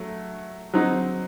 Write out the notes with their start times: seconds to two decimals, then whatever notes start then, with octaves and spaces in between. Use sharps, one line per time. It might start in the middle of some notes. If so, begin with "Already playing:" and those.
Already playing: F#3 A3
0.74 F#3 C4 D#4